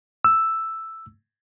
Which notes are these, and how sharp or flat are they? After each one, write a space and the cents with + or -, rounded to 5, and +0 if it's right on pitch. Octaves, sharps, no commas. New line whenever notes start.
E6 +5